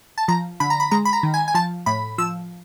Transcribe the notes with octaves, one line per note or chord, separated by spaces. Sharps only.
A5
F3 A#5
D3 B5
A#5
B5
G#3 A#5
B5
A#5
D#3
G#5
G#5
F3 A5
A2 B5
F3 E6